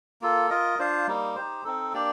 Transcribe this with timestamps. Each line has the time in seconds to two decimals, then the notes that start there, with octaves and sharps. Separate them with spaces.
0.21 A#3 F4 A4
0.50 F4 A#4 D#5
0.79 D4 F4 C5 F5
1.08 G3 A#3 D#4
1.35 D#4 G4 C5
1.64 C4 D#4 A4
1.93 A#3 D4 G4 D5